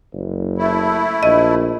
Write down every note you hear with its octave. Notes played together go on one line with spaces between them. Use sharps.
F#1
A3 E4
A#1 D#5